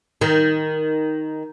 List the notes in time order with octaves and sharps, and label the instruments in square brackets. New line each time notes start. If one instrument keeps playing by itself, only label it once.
[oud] D#3